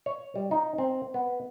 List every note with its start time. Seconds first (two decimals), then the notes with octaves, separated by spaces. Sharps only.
0.06 C#5
0.36 G3
0.51 D#4
0.78 C4
1.14 B3